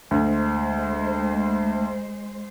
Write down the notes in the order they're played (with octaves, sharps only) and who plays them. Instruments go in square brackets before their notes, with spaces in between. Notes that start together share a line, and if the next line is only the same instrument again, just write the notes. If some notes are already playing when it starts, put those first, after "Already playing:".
[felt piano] D2 [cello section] G#3 C5